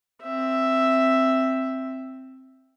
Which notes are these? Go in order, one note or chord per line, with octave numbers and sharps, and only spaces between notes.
C4 E5